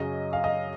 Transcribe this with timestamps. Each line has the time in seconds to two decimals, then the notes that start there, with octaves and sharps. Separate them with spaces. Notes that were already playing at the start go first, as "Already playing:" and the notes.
Already playing: F#2 C#3 F#3 C#4 D#5
0.33 F5
0.44 D#5